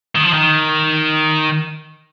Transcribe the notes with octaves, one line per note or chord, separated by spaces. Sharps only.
D#3
F3
D#3